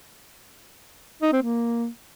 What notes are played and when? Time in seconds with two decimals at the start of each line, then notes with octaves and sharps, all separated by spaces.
1.22 D#4
1.32 C4
1.43 A#3